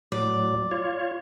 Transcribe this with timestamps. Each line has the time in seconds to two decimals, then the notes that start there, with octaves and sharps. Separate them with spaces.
0.12 A2 F#3 D5
0.71 F4 C#5